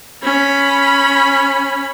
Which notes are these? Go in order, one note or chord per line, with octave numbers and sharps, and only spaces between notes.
C#4 B5